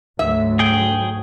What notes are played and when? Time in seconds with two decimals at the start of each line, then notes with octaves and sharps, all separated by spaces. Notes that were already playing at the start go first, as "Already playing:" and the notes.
0.19 D2 G#2 F#3 E5
0.59 G#4 G5